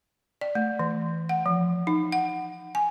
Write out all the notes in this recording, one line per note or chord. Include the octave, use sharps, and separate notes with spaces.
D5
A3
E3
F#5
F3
D#4
F#5
G#5